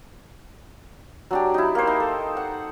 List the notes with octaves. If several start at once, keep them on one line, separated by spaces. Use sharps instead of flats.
F#3 D4 G4
D#4 E4
A#3 C5
D#4
A4
F#5